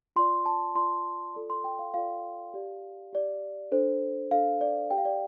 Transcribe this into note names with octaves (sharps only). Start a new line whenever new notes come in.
F4 D5 C6
A5
F4 D5 C6
F4 A4 D5
C6
G5
F5
F4 A4 D5 F5
G4 D5
G4 D5
D4 A4 C5
D4 A4 C5 F5
D5
G4 D5 G5
F5
D5